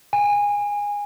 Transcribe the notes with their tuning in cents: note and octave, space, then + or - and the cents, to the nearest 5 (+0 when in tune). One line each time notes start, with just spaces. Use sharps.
G#5 -20